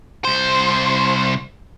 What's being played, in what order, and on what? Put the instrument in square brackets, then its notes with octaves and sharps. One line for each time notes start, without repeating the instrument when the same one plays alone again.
[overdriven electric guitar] C2 C5